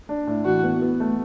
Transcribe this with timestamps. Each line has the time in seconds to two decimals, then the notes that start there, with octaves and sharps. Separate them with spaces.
0.09 D4
0.27 A2
0.45 E3 F#4
0.63 B3
0.82 B3
1.00 A3